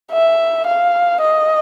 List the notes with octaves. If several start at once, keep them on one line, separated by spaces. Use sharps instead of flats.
E5
F5
D#5